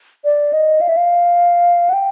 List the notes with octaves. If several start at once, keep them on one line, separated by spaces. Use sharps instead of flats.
D5
D#5
F5
E5
F5
F#5
G5